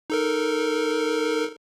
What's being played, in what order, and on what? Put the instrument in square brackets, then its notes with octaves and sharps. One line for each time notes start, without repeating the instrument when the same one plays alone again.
[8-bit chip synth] D#4 A4 A#4